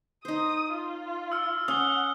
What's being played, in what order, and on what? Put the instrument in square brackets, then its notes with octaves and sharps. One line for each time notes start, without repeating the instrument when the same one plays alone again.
[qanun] D#4 C5 [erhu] D#6
[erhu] F4
[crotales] E6 F6
[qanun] C#4 [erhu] F#5 [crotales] D#6 G7